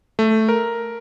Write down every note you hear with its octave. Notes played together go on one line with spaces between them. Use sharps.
A3
A#4